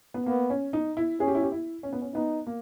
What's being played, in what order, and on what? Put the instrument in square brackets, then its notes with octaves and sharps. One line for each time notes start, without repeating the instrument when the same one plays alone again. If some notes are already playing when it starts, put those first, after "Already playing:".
[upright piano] B3
[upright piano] A#3 [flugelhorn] B3
[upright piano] C#4
D#4
E4
[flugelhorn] C#4 [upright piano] G#4
[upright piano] G4
E4
G4
E4
C#4
B3
C#4
[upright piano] B3 [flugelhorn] D#4
[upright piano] A#3